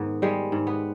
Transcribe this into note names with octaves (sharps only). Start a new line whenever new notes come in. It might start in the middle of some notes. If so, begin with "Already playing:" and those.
Already playing: G#2 D#3 B3
G3 G#3
G#2
B3